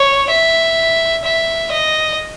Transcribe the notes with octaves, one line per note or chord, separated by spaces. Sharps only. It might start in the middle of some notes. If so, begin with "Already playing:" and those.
Already playing: C#5
E5
E5
D#5